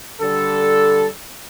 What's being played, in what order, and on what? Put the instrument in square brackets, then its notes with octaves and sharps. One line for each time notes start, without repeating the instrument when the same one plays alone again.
[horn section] D3 G3 A4